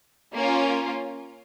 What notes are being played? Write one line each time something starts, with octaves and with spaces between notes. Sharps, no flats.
A#3 C#4 F4